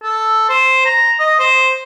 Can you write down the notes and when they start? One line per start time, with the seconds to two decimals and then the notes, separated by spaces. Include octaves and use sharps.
0.03 A4
0.49 C5
0.85 A#5
1.20 D#5
1.39 C5